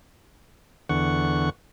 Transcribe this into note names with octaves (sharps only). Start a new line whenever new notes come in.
E2 D3 F#5 C#6